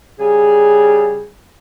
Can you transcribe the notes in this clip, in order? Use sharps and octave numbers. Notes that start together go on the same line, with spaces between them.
C#3 G3 G#4